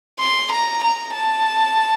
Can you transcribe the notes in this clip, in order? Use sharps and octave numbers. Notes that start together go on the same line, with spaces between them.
C6
A#5
A#5
A5